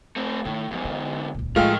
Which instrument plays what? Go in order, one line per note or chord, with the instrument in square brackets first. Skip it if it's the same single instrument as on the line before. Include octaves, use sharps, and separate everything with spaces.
[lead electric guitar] A3 C4
[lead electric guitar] A2 [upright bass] D#3
[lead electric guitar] E2 G#2 [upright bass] F3
[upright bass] D3
D#1 C#2
[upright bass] A2 F3 [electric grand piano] G#3 A3 F6 [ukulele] F4 [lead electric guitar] A#4 G5